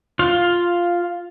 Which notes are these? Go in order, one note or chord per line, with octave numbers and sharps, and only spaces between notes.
F4 F5